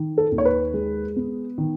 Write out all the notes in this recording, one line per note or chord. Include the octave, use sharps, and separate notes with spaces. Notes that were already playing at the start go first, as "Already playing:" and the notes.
Already playing: D#3
A4
D#2
C#5
B4
G#3
B3
D#3